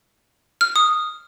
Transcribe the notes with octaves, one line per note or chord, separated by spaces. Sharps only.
F6
D#6